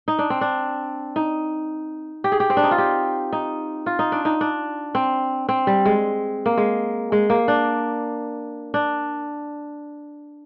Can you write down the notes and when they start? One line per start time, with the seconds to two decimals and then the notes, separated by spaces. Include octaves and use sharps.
0.08 D#4
0.19 D4
0.30 C4
0.41 D4
1.16 D#4
2.24 G4
2.32 G#4
2.40 G4
2.50 C4
2.57 D4
2.64 D#4
2.71 F4
2.78 G4
3.32 D#4
3.86 F4
3.99 D#4
4.12 D4
4.25 D#4
4.41 D4
4.95 C4
5.49 C4
5.67 G3
5.85 G#3
6.46 A#3
6.57 G#3
7.12 G#3
7.30 A#3
7.48 D4
8.74 D4